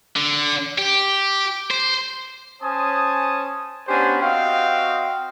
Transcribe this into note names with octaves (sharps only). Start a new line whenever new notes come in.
D3
G4
C5
C#4 C5 G#5 A5 D#6
B3 C#4 D4 G4 C5 G#5
C4 F#4 D#5 F5 G5